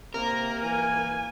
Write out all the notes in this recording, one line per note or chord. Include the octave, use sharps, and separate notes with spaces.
C3 A#3 A#4
E3 G#5